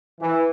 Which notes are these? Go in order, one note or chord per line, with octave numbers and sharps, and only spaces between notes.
E3